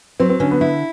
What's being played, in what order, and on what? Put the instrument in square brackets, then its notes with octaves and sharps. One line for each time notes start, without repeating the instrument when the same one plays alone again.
[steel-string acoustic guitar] F#3 [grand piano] C4
[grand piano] C4
[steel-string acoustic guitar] D3 [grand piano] C#4
[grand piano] B3
[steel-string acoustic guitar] E4